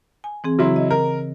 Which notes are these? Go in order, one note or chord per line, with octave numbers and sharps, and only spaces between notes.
G#5
E3 C4 G#4
C#3 F#3 E4 C6
D#5
A#4